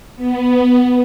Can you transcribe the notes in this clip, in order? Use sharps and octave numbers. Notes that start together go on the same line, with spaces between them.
B3